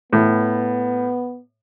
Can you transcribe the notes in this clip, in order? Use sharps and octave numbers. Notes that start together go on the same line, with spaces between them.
A2 B3